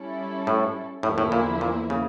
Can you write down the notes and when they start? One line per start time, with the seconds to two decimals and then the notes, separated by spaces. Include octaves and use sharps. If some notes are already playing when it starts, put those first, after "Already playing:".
Already playing: G3 C#4 E4 A4
0.47 A2
1.03 E2 A2 D3 F3 A#3 E4
1.18 A2
1.32 A#2
1.61 A#2
1.90 C#3